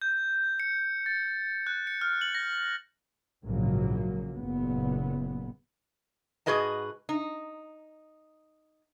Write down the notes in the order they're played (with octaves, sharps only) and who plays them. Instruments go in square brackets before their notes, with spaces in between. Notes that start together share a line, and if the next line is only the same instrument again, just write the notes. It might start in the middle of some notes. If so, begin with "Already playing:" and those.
[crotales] G6
C#7
A6
F#6
C#7
F6
F#7
A#6
[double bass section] A#1 G#2 C#3 F#3 A#3
F#1 A#2 B3
[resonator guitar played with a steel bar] G#2 F#4 G#4 B4 D#5 A5
D#4